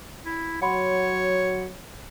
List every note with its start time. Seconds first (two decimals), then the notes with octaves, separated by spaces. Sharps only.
0.25 E4
0.62 F#3 C#5 F#5 B5 C6